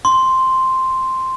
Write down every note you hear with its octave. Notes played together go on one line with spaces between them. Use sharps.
C6